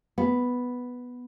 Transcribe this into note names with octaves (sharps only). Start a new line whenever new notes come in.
B3